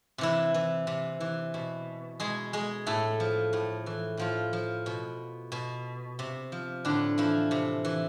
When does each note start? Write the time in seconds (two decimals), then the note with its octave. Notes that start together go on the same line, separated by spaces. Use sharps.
0.18 C3 E3 E4
0.54 E3
0.87 C3
1.20 E3
1.54 B2
2.20 B2 G#3 G#4
2.53 G#3 G#4
2.86 A2 A3 A4
3.20 F3
3.53 A2
3.86 E3
4.17 A2 F3 F4
4.53 F3
4.86 B2
5.52 B2
6.19 C3
6.52 F3
6.85 A2 D3 D4
7.18 E3 F3 E4
7.51 C3
7.85 E3